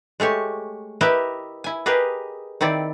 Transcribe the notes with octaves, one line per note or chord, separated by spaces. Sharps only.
G#3 A3 G4 C#5
E4 G4 A#4 B4 D#5 E5
E4 G#5
G4 G#4 A#4 B4 D#5
D#3 C4 E4 D5